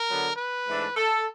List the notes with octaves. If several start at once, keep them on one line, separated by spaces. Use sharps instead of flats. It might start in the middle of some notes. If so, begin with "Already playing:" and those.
Already playing: A#4
D3 F#3 B3
B4
G#2 E3 A3 D4
A4